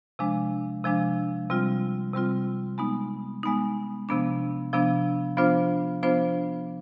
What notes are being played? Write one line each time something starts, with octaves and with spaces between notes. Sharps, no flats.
C3 F3 G#3 D4
C3 F3 G#3 D4
C3 G3 C4 F4
C3 G3 C4 F4
G#3 B3 D#4
G#3 B3 D#4
C3 F3 B3 D4
C3 F3 B3 D4
F3 B3 D4 F4 C5
F3 B3 D4 F4 C5